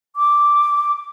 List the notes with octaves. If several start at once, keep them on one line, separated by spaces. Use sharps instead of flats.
D6